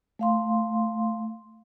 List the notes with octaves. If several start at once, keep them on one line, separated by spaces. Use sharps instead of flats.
A3 F5 C6